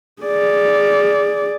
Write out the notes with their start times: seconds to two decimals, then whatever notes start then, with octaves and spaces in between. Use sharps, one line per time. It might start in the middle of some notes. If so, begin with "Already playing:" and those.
0.23 G#4 D5